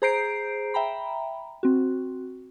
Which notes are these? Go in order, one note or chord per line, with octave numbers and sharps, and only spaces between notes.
G#4 C5 A#5 G6 C7 D7
E5 G5 A#5 B5
C4 F#4